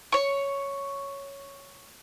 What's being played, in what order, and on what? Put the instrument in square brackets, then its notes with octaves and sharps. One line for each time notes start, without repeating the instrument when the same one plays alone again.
[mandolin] C#5 C#6